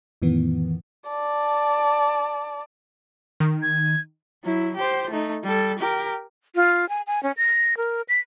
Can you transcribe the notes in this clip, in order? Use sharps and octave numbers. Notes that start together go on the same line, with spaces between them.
F2 A2 D#3 E3 B3
D5 A5
D#3
G#6
F#3 E4
G4 C5
A3 D#4
G3 A4
G4 A#4
F4
G#5
G#5
C#4
A#6
A#4
B6